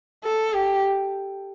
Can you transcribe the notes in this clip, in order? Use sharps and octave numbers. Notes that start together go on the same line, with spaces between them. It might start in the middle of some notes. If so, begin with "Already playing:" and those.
A4
G4